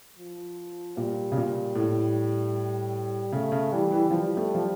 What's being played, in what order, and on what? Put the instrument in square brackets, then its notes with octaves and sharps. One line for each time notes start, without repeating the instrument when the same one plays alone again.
[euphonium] F3
[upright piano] A#2 [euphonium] G3
[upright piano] C#3
A#2
A2
[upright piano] C#3 [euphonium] A3
[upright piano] C#3
[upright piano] E3 [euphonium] G3
[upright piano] E3
[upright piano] F3 [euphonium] G3
[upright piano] A3
F3